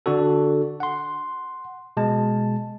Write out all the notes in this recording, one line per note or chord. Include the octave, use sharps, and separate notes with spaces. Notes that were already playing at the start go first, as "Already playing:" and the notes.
D3 D4 F#4 A4
F#5 C6
B2 G#3 A5